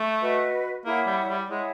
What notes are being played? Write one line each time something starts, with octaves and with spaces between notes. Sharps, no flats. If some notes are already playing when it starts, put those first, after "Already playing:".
Already playing: A3
F#4 B4 D#5
A#3 E4 G#4 C#5 F#5
G3
G3
G#3 E4 G#4 C#5 F#5